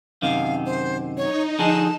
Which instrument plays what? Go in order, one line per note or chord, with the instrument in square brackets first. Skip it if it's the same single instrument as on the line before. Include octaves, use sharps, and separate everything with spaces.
[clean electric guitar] F#2 C3 D#3 [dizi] F5
[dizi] C5
[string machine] D#4 [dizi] C#5
[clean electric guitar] D3 F3 G#4 [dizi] A5